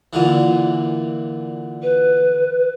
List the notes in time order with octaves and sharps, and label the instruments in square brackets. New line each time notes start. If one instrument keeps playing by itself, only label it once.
[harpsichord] A#2 D3 E3
[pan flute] B4